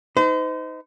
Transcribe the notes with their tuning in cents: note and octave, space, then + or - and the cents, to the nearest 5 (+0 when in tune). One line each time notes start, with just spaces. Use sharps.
D#4 +20 C5 -40